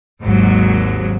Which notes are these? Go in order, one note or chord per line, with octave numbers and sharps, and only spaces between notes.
G#1 D#2 G#2 F#3